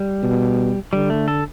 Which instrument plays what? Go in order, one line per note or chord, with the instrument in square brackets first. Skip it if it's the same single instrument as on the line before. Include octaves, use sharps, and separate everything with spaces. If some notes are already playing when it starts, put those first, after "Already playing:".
Already playing: [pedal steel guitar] G3
[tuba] B2
[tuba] D3 [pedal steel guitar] G3
[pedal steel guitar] A3
A4